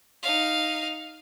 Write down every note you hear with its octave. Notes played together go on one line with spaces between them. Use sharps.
D#4 F5